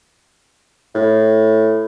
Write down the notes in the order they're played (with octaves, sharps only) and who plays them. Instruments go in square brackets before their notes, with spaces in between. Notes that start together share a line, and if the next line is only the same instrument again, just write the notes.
[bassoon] A2